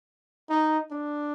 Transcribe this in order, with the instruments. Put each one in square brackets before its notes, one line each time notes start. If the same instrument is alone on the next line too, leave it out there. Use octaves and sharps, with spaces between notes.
[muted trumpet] D#4
D4